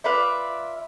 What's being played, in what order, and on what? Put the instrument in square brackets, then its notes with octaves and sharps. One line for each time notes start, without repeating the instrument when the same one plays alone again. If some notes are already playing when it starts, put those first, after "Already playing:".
[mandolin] F4 B4 D5 E5